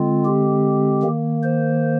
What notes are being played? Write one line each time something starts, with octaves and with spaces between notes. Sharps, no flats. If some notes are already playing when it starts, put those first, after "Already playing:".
Already playing: D3 G#3 C4 F4
G4
D#3 A#3
C5